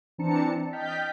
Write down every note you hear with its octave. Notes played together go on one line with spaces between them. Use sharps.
E3 C4 D4 A5 A#5 C#7
D#5 G5 F6 G6 A6 B6